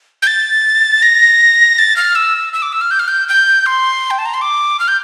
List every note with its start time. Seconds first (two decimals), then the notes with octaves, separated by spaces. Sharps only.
0.22 G6
0.27 A6
1.02 A#6
1.78 A6
1.96 F6
2.15 E6
2.53 E6
2.62 D6
2.72 E6
2.81 F6
2.91 G6
2.99 F6
3.08 G6
3.28 G6
3.66 C6
4.10 G5
4.18 A5
4.26 A#5
4.34 C6
4.41 D6
4.80 F6
4.88 G6